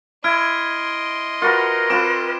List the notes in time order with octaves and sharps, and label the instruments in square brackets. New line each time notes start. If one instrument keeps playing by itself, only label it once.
[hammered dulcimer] E4 [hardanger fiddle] D#5 C6 [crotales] F6 G#6 D7
[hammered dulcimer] F4 F#4 B4 [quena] A#4
[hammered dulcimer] C4 F4 B4 [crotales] D6 D7 E7